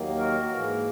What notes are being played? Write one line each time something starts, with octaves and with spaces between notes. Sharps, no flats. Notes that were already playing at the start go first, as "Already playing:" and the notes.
Already playing: D#2 D#3 F#3 A#3
F#4 A#4
G#2 E3 A#3